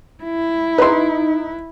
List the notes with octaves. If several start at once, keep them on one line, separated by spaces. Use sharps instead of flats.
E4
D#4 B4 C6